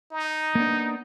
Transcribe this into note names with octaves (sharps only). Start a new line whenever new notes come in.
D#4
A#3 B3 D4